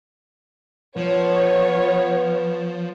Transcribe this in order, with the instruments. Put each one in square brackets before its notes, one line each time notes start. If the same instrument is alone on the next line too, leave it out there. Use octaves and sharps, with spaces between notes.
[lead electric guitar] F3 [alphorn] B3 [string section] C#5